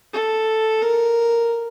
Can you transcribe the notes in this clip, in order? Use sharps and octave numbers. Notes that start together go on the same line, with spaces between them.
A4
A#4